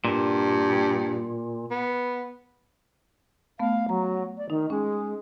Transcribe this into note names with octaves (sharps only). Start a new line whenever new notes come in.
G2 A#2
B3
A3 B3 F5
F#3 A#5
D5
D#3 D#4
G#3 C#4